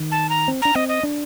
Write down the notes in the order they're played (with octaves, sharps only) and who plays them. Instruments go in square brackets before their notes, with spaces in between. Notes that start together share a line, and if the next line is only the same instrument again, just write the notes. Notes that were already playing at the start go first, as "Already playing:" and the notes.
Already playing: [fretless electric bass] D#3
[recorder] A5
A#5
[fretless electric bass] C4
[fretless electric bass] D4 [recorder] A#5
[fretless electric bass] C4 [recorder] D#5
[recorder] D#5
[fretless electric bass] D4